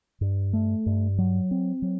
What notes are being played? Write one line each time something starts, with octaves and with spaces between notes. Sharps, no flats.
G2
A3
G2
F#3
C4
F#3